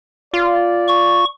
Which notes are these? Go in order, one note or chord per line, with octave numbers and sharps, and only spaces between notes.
F4 D5
C#6